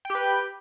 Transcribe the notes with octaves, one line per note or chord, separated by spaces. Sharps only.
G4 B4 G5